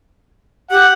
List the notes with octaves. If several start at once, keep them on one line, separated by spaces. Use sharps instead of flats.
G4 F#5